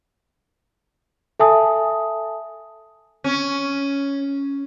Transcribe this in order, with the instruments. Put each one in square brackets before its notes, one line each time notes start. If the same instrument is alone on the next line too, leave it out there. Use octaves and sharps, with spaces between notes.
[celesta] A4 E5 G#5 A5 D#6
[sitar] C#4